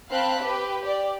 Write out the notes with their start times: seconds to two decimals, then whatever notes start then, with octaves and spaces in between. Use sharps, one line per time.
0.10 C4 F5 A5 B5 F#6
0.41 G4 B4
0.82 G4 D5